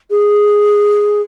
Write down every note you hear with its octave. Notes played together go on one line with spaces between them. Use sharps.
G#4